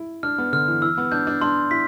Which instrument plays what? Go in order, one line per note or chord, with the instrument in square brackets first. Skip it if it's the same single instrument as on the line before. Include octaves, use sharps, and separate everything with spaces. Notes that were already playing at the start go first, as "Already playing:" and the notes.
Already playing: [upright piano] E4
[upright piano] D4 [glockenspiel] F6
[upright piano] B3
[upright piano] D3 [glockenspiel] F6
[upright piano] E3
[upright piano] E3 [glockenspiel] E6
[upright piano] B3
[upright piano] D4 [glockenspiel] G6
[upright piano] D4
[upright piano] D4 [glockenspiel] C6
[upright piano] E4 [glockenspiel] B6